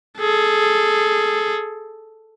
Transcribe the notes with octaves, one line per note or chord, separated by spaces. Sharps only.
G#4 A4